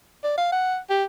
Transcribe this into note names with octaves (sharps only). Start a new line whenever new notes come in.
D5
F5
F#5
G4